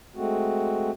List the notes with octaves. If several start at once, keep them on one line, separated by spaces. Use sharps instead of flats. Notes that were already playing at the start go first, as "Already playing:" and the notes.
G#3 A3 C4 F#4